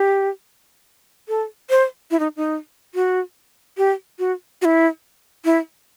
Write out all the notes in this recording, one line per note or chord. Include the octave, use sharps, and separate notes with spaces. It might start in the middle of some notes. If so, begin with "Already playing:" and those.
Already playing: G4
A4
C5
E4
D#4
D#4
F#4
G4
F#4
F#4
E4
E4